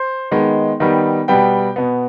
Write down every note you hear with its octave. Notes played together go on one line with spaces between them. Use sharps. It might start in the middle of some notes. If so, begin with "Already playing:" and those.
Already playing: C5
D#3 G#3 B3
D#3 G3 B3
B2 G3 B3 G5
B2 B3